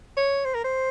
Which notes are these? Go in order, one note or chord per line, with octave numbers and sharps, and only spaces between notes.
C#5
C5
A#4
C5